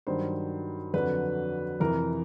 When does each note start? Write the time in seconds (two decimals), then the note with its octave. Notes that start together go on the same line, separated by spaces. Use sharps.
0.07 G2 D#3 F#3 C5
0.94 F2 D3 F#3 B4
1.80 F2 C3 E3 A#4